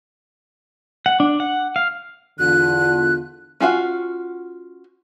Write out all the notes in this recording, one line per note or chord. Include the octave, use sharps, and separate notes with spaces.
F#5
D4
F#5
F5
E2 D3 F4 F#6
C#4 F4 F#4 F5